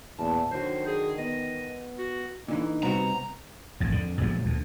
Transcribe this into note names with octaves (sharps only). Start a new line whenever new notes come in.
E2 A#2 A5
F#2 D3 D#3 F#4 C5
G#4
B3 D#5
F#4
A#2 D3 E3 D#4
C3 G3 B3 C4 F#4 A#5
A1 F2 G#2
F2 D3
A#2 F3 F#3 G#3
D2